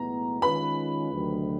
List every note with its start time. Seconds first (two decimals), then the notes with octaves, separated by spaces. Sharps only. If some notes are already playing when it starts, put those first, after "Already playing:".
Already playing: B1 A2 E3 G#3 B3 A#5
0.42 D#3 G#3 C#4 F4 B4 B5
1.11 D2 C3 D#3 F#3